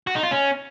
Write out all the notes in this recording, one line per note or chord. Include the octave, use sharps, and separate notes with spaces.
F#4
D#4
F4
C#4